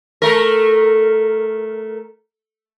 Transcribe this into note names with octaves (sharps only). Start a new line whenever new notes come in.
A3 A#4